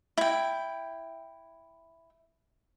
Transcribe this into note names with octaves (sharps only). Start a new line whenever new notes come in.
E4 G5